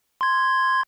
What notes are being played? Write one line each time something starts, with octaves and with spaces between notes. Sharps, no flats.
C6 G#6